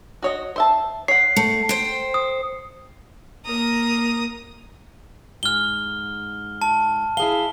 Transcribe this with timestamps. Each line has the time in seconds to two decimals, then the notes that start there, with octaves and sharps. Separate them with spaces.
0.23 F#4 C#5 D#5
0.56 C5 E5 A5
1.08 C#5 F#5 C7
1.36 A3 C#7
1.69 C5 G5
2.14 D#6
3.47 A#3 A#4 A#5 D#6
5.43 G#2 F6 G7
6.62 A5
7.17 E4 G#4 F5 G7